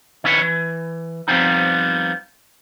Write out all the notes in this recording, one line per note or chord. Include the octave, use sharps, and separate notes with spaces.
D#3 C#4 E4 B4 C#5
E3
F3 G3 B3 C4 D#4